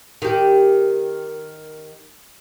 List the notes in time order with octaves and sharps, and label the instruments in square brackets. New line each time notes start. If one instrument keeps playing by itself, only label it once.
[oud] D#3 G4